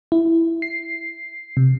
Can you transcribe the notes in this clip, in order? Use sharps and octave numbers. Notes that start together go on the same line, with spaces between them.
E4
C7
C3